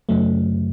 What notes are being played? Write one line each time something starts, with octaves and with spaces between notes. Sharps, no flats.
F#2 C#3 F#3 A3